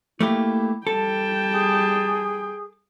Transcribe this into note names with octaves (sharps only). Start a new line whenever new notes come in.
A3 A#3 E4 G4
G3 A4 G5 A5
G#4